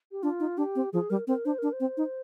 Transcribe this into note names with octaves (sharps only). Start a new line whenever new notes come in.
G4
D4 F4
D#4
D4 G4
C4
F3 G#4
G3 A#4
C4 A#4
D4 C5
D4 A#4
C5
C4
D#4